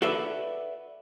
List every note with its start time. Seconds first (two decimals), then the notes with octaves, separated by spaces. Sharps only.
0.02 F#4 A4 B4 D5 E5